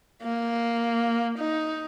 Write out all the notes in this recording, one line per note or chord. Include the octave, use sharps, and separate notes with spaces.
A#3
D#4